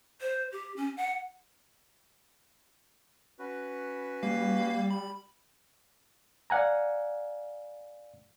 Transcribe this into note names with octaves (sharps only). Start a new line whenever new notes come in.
C5
G4
C#4
F#5
C#4 F#4 B4
G3 A#3 F5
B5
D5 F5 F#5 G#5 A#5